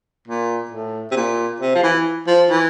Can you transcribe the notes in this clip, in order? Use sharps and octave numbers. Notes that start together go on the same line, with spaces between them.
A#2
A2
C3
A#2
C3
F3
E3
F3
E3